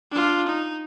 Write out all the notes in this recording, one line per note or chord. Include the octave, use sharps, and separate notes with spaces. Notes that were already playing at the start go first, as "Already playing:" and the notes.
D4 F4
D#4